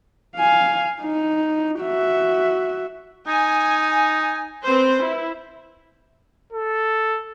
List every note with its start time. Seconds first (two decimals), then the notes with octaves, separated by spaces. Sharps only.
0.36 F5 G#5
1.02 D#4
1.80 F#4 E5
3.27 D#4 G#5
4.63 C4 B4 C5
5.02 E4
6.53 A4